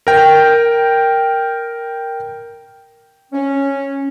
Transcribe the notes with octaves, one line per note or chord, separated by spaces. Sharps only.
A#4 G5
C#4